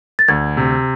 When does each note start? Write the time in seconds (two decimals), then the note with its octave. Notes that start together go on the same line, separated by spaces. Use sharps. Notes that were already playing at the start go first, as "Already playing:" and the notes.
0.19 A6
0.28 D2 G#6
0.57 C3